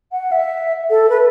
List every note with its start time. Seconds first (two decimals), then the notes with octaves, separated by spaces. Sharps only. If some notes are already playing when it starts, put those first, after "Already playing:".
0.11 F#5
0.31 E5
0.89 A4
1.09 B4